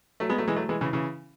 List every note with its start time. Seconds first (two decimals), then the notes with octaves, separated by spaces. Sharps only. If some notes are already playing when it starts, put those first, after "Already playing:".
0.20 F#3 A3
0.29 G#3 B3
0.38 F#3 A3
0.48 E3 G#3
0.56 F#3 A3
0.69 E3 G#3
0.81 C#3 E3
0.93 C#3 E3